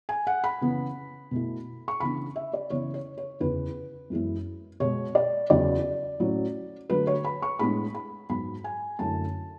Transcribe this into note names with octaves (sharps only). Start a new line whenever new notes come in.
G#5
F#5
B5
C#3 E3 B3 E4
B2 A3 E4
C#6
C#3 E3 B3 D4 B5
E5
D5
C#3 E3 B3 E4 C#5
C#5
C#5
E2 C#3 E3 B4
F#2 E3 G#3 B3 E4
B2 G#3 B3 C#5
D5
E2 C#3 F#3 D5
A2 F#3 C#4
D3 F#3 A3 B4
C#5
B5
C#6
A2 G#3 B3 D4 B5
B5
G#2 F#3 B3 B5
G#5
F#2 D3 A3 E4 A5